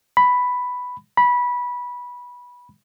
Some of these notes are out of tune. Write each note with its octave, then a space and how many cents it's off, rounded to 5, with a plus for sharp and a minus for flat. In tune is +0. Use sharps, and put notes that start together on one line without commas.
B5 +5
B5 -15